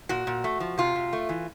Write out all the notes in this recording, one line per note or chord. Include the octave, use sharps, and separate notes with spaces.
A#2 F#4
A#2
A3
F3
C3 F4
C3
A3
E3